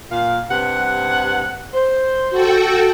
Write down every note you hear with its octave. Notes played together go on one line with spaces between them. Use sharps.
A#2 F5
G2 C3 F#5
C5
F#4 A4 G5